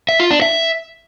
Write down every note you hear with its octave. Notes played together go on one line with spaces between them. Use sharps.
E5
F4
D4
E5